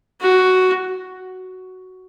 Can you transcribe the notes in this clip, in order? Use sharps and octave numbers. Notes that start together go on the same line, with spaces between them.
F#4